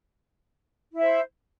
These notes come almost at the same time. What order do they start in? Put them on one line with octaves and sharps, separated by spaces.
E4 E5 C5